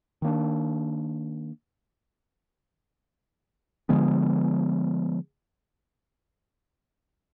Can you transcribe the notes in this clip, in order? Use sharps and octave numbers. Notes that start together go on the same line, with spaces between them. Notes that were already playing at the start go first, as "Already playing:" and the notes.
D#3 A#3 D4
D3 F3 G#3 B3